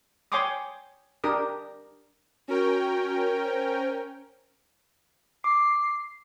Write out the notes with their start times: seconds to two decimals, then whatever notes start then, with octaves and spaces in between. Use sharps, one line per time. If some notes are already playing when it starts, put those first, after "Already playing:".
0.32 C#5 G5 G#5 C6 D6 D#6
1.24 D4 G4 A#4 D#6
2.48 C#4 F#4 A#4 G5
3.44 C5
5.44 D6 C7